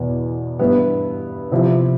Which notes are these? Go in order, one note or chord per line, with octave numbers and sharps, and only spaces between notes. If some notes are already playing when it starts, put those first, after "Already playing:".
Already playing: E2 B2 B3
G2 E3 B3 E4
C3 F3 C4 E4